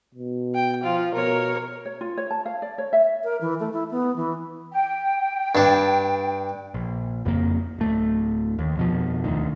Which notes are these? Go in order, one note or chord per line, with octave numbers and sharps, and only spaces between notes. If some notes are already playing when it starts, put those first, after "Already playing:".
B2
G5
F3 F4
B2 A#4 C#5
C#5
F4
C#5
A5
F5
D5
C#5
E5
A#4
E3
A3
E4
B3
E3
G5
G2 D4
A#1
F#1 F2 C#3 A#3
D1 A3
D#2
F2 B2 F3
E1 D2 D#3